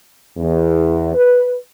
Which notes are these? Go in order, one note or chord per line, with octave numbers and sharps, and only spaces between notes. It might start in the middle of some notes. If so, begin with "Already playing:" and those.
E2
B4